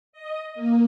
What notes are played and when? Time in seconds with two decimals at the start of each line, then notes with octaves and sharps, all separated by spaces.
0.13 D#5
0.55 A#3